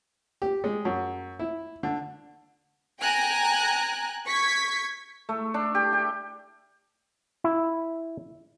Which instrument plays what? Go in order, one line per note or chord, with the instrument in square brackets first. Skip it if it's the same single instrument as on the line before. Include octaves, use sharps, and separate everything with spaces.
[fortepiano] G4
G#3
F#2
E4
D3
[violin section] G5 G#5 A#5 F#6
C#6 G#6 B6
[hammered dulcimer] A3
D4
G4
G4
[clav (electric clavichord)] E4